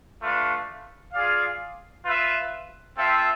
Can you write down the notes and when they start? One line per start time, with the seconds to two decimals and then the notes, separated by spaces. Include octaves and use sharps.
0.22 A3 D4 F4 B4 F5
1.13 F4 G#4 D5 F5
2.05 F4 B4 E5
2.97 C4 F4 A4 E5